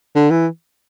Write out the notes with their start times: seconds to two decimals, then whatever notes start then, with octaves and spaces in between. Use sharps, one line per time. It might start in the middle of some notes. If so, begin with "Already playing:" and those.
0.15 D3
0.30 E3